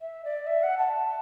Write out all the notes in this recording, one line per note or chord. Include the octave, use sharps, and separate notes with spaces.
E5
D5
E5
F#5
A5